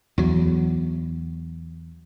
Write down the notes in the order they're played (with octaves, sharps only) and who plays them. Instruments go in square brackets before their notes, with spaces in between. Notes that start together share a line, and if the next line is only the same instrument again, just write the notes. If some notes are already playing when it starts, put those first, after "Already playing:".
[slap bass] E2 F#3